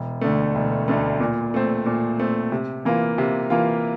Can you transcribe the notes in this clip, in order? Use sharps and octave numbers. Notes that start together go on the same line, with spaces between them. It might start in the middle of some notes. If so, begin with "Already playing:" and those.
Already playing: E1
D2 D3 A3
E1
D2 D3 A3
A#2
A3 C4
A#2
A3 C4
C3
E3 A#3 F4
C3
E3 A#3 F4